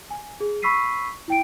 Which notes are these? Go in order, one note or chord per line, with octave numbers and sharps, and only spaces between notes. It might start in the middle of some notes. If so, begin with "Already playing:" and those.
G#5
G#4
B5 C#6 E6 B6 C7 D#7
E4 G5 D7